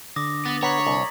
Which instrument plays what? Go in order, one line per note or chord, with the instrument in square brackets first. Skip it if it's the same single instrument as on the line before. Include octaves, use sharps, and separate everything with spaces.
[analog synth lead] D3 [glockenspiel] D6 D#6 A#6
[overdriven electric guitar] B3 [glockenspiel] A6
[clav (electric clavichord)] B3 [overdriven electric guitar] C#5 [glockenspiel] A#5 B6 F#7
[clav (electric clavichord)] C2 [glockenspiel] F#7